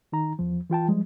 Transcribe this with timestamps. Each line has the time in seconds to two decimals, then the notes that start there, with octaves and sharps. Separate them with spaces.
0.12 D#3 D#4 A#5
0.39 E2 F3
0.70 E3 F4 G5 A5
0.88 F3 G3 G#3